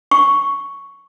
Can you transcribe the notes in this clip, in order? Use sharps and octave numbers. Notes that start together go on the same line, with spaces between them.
C#6